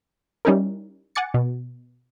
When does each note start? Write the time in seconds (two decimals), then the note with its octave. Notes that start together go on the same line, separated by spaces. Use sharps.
0.45 G3 C#4 D#4 E4 A#4
1.15 F#5 G#5 D6 A6 C#7
1.34 B2